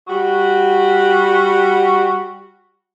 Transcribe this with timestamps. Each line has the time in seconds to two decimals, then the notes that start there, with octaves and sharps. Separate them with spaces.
0.08 G3 F#4